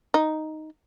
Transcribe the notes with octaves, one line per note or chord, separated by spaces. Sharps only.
D#4